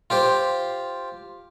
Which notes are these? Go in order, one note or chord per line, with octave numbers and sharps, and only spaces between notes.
F4 G4 C5